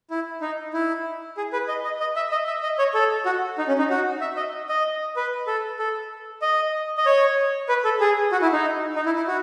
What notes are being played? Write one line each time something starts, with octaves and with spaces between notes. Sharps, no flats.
E4
D#4
E4
G#4
B4
D#5
D#5
D#5
E5
D#5
E5
D#5
C#5
A4
F#4
D#4
C#4
D#4
F#4
E5
D#5
D#5
B4
A4
A4
D#5
D#5
C#5
B4
A4
G#4
F#4
E4
D#4
D#4
E4
E4
F#4